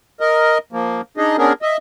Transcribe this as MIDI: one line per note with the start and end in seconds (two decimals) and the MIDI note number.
0.20 0.58 70
0.20 0.58 75
0.73 1.01 53
0.73 1.01 58
1.17 1.37 62
1.17 1.37 63
1.17 1.37 68
1.17 1.37 75
1.38 1.53 59
1.38 1.53 61
1.38 1.53 62
1.38 1.53 68
1.38 1.53 70
1.62 1.77 75
1.62 1.77 76